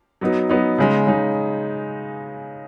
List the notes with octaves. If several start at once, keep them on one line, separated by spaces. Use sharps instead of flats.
F#3 B3 D#4
F#3 B3 D#4
C#3 G#3 D#4
C#3 G#3 D#4